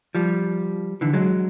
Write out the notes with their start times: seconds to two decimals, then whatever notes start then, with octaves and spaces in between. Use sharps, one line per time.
0.15 F3 G3
1.01 D3 E3
1.13 F#3 G#3